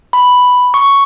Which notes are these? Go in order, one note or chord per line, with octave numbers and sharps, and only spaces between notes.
B5
C#6